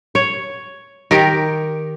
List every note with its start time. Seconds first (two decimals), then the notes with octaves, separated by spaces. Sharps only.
0.15 C#5
1.11 D#3 G4 A#4